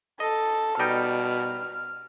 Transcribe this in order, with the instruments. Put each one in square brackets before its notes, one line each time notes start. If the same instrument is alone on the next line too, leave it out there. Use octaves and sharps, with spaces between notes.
[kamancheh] A4 [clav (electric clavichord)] D#5
[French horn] B2 [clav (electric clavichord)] G3 D#4 G5 [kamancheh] F6